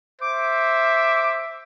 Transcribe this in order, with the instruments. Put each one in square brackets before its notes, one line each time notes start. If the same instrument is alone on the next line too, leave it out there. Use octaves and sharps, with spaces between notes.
[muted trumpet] C5 [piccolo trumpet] E5 [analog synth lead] D6